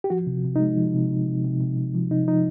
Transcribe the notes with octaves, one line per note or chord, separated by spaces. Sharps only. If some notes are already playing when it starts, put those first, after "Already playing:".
G4
F3 F#4
C3
C3
G#3 D#4
F3
C3
C3
C3
C3
C3
C3
F3
C3 D#4
F3 D#4